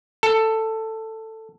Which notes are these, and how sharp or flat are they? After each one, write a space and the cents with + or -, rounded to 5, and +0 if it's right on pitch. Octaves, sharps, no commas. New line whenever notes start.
A4 +10